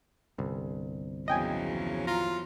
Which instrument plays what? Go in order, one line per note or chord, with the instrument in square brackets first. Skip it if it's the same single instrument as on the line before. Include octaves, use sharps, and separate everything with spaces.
[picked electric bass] G1 C2
[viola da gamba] E2 F3 F#3 [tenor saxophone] C#3 [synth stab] D#5 G5 G#5
[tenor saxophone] F4 [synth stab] A#5